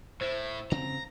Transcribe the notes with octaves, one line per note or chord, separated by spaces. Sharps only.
A2 E4 C5
C#3 C4 A#5